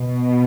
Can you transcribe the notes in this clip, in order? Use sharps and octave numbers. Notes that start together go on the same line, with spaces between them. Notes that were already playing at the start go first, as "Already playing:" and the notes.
Already playing: B2